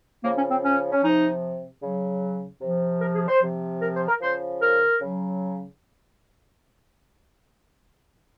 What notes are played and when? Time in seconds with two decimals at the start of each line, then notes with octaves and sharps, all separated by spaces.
0.23 C#3 F3 A#3
0.36 C#4
0.50 C4
0.63 C#4
0.91 C#4
1.02 C3 F3 D#4
1.82 C#3 F#3
2.61 C3 F3
3.01 A#4
3.14 G#4
3.28 C5
3.42 C3 F3
3.81 A#4
3.94 C5
4.08 A#4
4.20 C#3 F3 C5
4.61 A#4
5.00 C#3 F#3